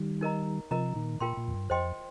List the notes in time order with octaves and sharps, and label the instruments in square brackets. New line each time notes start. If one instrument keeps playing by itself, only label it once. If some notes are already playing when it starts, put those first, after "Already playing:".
Already playing: [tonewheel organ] D#3 G3
[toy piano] D#4 A#4 D#5 A#5
[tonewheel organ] C3 F3 [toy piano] A#4 D#5 A#5
[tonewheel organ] A#2 D#3
[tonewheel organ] A#2 [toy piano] F4 A#4 G5 C6
[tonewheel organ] A#2
F2
G2
[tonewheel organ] F2 [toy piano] C5 D#5 G5 C6